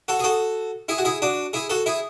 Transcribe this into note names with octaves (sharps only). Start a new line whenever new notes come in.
F#4 A4
G#4
F#4 A4
E4 G#4
F#4
E4 G#4
D4 F#4
E4 G#4
F#4 A4
E4 G#4